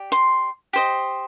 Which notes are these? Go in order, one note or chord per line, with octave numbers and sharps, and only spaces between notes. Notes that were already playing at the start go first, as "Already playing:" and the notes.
Already playing: G4 D5
C6
G4 C5 D#5